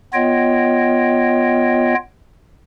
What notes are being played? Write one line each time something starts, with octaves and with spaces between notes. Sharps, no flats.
B3 F4 C#5 D#5 G5